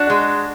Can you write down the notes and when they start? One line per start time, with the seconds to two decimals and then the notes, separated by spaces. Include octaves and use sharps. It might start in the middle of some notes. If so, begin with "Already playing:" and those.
Already playing: D4 F#4
0.10 G#3